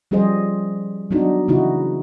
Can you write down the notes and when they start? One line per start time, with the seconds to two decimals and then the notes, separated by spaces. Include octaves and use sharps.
0.11 F3 G3 C#4 G#4 C5 D#5
1.11 F#3 B3 D4 D#4 F#4
1.48 C#3 E3 D#4 E4 F#4